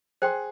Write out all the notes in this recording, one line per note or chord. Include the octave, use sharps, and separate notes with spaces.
G#4 C5 G5 C6